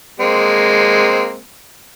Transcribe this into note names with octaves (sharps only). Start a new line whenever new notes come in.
G#3 A#3 C4